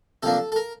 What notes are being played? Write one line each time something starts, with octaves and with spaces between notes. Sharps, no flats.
C3 F3 A#3 D4 A4
A4
A#4